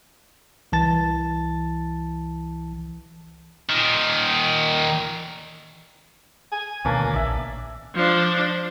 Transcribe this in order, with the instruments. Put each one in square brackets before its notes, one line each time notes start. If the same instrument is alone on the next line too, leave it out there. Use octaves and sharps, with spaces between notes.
[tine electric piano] C2 E3 A5 A6
[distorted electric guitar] A#2 D#3
[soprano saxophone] G#5
[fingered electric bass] D2 B2 D#3 [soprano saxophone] A#3 [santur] C#4 D4 D5
[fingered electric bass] A#1 [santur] D5 E5
[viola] F3 D4